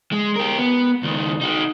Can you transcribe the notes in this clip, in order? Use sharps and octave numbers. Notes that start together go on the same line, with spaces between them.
G#3
G4 A#4
B3
C#2 D#3
D#4 F#4